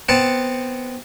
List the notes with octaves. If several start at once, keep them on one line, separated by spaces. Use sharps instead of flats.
B3 C4 F#5 A5